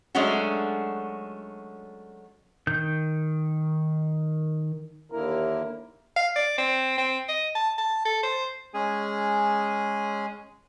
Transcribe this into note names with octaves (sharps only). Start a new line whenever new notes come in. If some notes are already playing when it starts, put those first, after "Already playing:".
F#3 G#3 A3 C#4 D4 F#4
D#3 G6
D#2 D3 A#3 E4 A#4
F5
D5
C4
C4
D#5
A5
A5
A4
C5
G#3 C#4 G#4 G#5